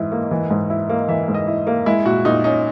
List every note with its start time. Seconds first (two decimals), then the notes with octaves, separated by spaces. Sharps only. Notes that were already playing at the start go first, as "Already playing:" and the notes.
Already playing: G#2 E3 E4
0.12 A#3
0.31 E3
0.51 G#2
0.70 E4
0.89 A#3
1.08 E3 E5
1.28 G#2
1.34 D#5
1.47 E4
1.67 A#3
1.86 G#3 E4
2.06 A#2 F#4
2.25 A#2 D#4
2.44 C#4 D#4